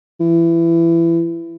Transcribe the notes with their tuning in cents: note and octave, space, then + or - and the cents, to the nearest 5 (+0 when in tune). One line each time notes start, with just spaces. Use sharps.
E3 +20